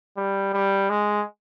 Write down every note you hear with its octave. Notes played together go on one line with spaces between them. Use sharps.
G3
G3
G#3